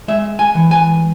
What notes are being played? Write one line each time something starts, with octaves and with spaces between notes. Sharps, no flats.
G#3 E5
G#5
E3
G#5